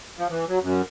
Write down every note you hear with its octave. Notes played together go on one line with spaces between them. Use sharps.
F3
E3
F#3
F#2